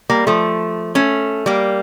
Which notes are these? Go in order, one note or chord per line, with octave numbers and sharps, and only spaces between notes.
G3 A#3
F3 A3
A3 C#4
G3 A#3